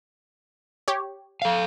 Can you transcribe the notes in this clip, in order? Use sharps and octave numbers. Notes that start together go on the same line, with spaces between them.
G4 C#5
A4 F5